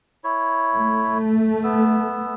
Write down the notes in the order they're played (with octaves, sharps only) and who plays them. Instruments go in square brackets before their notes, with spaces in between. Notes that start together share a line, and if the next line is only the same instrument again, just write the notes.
[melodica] E4 C#5
[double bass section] A3
[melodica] B3 E6